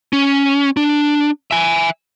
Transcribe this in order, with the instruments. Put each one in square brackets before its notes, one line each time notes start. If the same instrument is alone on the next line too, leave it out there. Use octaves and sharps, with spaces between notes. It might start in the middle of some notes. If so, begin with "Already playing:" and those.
[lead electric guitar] C#4
D4
E5 G#5